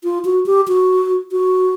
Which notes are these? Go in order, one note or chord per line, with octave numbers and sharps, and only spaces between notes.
F4
F#4
G4
F#4
F#4